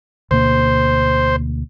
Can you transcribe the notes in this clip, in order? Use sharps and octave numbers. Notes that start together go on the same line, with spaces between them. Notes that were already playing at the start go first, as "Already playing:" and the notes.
D2 B2 A#3 C5